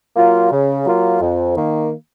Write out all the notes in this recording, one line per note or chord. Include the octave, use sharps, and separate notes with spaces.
F#3 A#3 F4
C#3
F#3 A#3 F4
F2
D#3 A#3